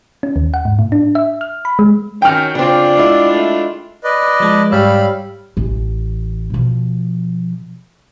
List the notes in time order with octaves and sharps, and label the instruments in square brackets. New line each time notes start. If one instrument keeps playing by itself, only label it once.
[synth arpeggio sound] C#4
D#2
F#5
G#2
A2
D4
E5
F6
B5
G#3
[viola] D#3 F#4 [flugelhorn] C#4 [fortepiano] G5 F6
[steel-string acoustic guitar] C#3 C4 [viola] D4 F4 [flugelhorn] D5
[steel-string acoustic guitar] G#3 E4
[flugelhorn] A3
[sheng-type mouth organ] B4 D5 D#5
[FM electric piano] F3 G#3 A5
[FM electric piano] G#2 C#5 E6 [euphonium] G3 [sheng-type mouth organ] F5 B5
[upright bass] A1
B2 F3